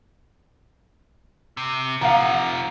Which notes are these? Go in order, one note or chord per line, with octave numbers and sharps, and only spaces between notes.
C3
C3 F3 F5 F#5 A#5